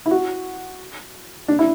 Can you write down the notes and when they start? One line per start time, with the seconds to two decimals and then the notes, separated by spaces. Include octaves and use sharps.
0.06 E4
0.11 F#4
1.48 D4
1.59 E4